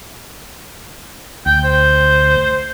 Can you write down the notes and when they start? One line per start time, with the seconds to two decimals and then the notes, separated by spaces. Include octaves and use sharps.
1.46 D2 G5
1.65 C5